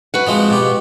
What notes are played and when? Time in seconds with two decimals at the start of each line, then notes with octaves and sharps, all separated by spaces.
0.14 F#4 B4 F#5
0.27 F3 G#3 C4
0.50 B2 G4